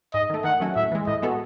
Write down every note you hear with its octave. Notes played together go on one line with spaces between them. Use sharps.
G#2 D#5
D#3 A3
D#3 F#5
F#3 A3 C#4 F#4
A2 E5
E3 G#3
A2 D#5
G#3 B3 F#4 A4